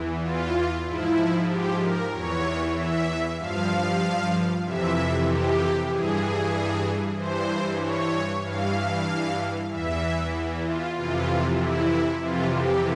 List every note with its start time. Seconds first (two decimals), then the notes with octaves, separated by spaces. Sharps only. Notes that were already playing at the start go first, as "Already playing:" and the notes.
Already playing: E2 E3
0.22 F4
0.86 G#2 F3 E4
1.49 G4
1.81 A#4
2.12 E2 E3 C#5
2.74 E5
3.38 G2 F3 F5
4.64 F2 C3 E3 E5
5.27 G4
5.91 G2 E3 G#4
7.17 G2 E3 C5
7.80 C#5
8.44 G2 E3 F5
9.69 E2 E3 E5
10.65 F4
10.96 F2 C3 E3 F4
11.59 E4
12.22 F2 C3 E3 F4
12.54 G4